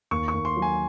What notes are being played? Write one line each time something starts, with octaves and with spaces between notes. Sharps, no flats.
D#2 C#6
C#6
D#2
C6
F#3
G#5